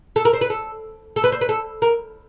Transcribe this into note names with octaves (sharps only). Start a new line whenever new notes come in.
A4
A#4
C5
B4
A4
A4
B4
C5
B4
A4
A#4